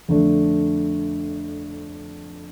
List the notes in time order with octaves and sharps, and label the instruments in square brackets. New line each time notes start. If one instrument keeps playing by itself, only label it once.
[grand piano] F2 D3 A3 D4